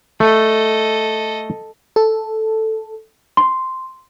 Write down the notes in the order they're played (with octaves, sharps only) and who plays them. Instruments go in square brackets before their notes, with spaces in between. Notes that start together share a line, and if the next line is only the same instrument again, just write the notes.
[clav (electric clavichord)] A3 [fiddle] A4 D#5
[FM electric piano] A4
[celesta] C6